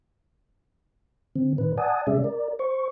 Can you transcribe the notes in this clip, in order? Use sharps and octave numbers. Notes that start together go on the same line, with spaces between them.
D3 C4
A2 D#3 B4
D5 F#5 G#5 A5 D#6
C3 G#3 C#4 G#4 D5 E5
A#4 D5
C5 C#6